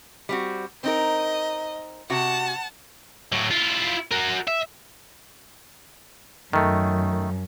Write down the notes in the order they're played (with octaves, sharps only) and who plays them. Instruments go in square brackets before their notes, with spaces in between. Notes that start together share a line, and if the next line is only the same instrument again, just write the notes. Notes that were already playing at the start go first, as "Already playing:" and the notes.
[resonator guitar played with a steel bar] G3 C4 F#4
[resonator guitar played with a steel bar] C4 D#4 A#4 [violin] D#5
[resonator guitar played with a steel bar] C3 F#4 [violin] F#5 A5
[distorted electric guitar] A2 F#3
E4 F4
F#4 A#4
E5
[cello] F#2 [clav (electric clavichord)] D#3 A3